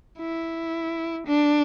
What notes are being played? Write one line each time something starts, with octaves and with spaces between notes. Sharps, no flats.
E4
D4